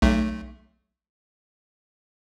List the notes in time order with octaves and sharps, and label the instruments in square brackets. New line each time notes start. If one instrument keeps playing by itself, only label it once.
[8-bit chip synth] B1 A3